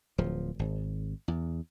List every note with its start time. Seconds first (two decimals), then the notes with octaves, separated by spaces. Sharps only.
0.18 D1 F3
0.59 G#1
1.28 E2